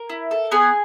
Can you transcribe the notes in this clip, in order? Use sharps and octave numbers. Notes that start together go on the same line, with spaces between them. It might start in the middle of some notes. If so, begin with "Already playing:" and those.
Already playing: A#4
E4
A4
B3 G#4 G#5